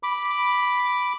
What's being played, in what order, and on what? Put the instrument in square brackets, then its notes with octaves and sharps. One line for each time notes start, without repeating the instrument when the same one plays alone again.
[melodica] B5 D6